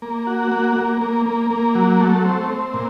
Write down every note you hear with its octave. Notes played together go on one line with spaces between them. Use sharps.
A#3
F#4
A#3
A#3
A#3
A#3
A#3
F#3
A3
C4
C4
A#2